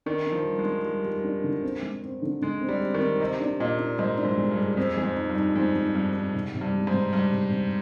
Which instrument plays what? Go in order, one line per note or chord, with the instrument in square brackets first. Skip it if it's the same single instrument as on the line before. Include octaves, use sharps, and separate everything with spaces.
[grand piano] D#3 [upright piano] D4
[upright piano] D4
[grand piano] F3
[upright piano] G3
[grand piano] G#3
[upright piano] D4
G3
G3
D4
D3
C4
G#3
C4
D3
[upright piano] D3 [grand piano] G#3
[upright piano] C4
[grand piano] G3
[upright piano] C4
[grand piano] D#3
[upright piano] C4
[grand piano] C3 [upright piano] D#5
[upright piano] D4
[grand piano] A#2 [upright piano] D#5
[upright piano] D4
[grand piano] G#2 [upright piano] D#5
[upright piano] D4
[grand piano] G#2
[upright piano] G#3
[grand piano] G2
[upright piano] G#4
[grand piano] F2 [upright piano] C4
[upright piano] G#3
[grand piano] F2
[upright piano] D#4
[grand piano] G2
[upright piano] D#4
[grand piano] F2 [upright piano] G#3
[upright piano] G#3
[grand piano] G2 [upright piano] C4
[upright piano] C4
C3
C3
[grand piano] G2
[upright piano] G#3
[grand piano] G#2
[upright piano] C3
[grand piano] G2 [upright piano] C3
[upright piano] C3
C3